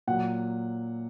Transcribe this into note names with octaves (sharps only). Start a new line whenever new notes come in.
A#2 F#3 F#5